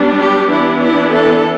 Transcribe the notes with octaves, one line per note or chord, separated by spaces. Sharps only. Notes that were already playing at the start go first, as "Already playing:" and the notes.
Already playing: G3 B3 D4
G4
E3 B3 D4 E4
E4
A4